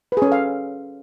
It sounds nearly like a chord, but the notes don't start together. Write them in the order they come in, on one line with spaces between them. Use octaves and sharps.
B4 G#4 C#4 A4 F5